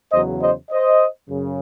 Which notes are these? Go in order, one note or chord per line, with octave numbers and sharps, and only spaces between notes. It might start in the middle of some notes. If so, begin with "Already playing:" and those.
E2 C#3 F#3 C5 D#5
C5 D#5
C5 D#5
F#2 C#3